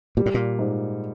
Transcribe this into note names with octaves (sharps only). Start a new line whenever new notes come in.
A#2 G3
A2
A#2
G#2